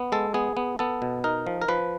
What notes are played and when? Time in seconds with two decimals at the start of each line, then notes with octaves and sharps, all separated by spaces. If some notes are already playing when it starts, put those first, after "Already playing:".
Already playing: B3
0.12 G#3 A4
0.34 B3 G#4
0.57 B3
0.79 B3 A4
1.02 B2
1.24 D#4 A#4
1.46 F3
1.62 A#4
1.68 F3 B4